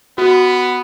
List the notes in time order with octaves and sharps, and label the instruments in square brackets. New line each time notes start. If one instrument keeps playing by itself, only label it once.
[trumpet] B3 [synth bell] F#4